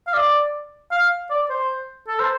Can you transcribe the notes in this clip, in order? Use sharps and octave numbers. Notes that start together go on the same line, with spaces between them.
F5
D5
F5
D5
C5
A4
C5